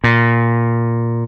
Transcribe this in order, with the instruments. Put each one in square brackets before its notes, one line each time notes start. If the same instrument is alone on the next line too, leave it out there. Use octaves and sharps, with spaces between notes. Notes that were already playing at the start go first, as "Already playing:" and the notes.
[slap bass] A#2